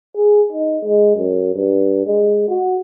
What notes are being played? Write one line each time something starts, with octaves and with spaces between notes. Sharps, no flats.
G#4
D#4
G#3
F#2
G2
G#3
F#4